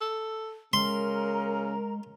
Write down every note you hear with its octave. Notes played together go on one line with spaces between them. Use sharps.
A4
C#3 G#3 A#4 A#5 C6